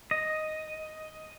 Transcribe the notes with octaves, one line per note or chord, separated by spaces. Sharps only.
D#5